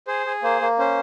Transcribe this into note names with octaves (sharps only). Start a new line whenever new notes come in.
G#4 C5
G#4
A#3 C5
A#3
C#4 C5